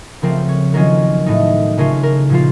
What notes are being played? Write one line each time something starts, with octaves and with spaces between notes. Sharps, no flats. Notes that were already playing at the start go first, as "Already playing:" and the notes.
C#3 F3 A3 C4 A#4
C#5
D#3 F#3 A#3 C#4 F4 A#4
A2 A3 D#4
C#3 A3 C#4 F4 A#4
A#4
A#2 F3 A#3 F4